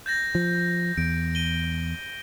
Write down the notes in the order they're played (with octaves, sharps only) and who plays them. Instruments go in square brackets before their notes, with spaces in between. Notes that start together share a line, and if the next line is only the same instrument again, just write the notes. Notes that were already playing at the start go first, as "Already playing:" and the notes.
[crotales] G6 A6 A#6
[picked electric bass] F3
[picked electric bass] E2 [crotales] D7
[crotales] D#7 G7